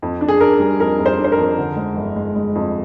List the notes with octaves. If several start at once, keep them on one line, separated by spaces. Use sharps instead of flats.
F2
D4
G#4
D4 A#4
G3
F2 A#4
F2
C5
D4
C5
A#4
F2
D3
G#3
G1
G#3
G#3
F2